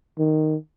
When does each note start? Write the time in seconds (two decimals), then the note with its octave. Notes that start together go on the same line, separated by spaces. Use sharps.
0.18 D#3